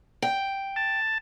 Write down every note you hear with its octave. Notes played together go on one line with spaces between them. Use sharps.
G5
A5